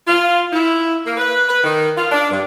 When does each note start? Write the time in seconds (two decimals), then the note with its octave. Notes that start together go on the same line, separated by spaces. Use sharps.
0.07 F4
0.52 E4
1.05 A#3
1.18 B4
1.49 B4
1.64 D#3
1.96 F4
2.11 D4
2.31 G2